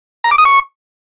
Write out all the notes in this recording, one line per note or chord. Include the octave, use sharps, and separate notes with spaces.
A#5
D6
D#6
C#6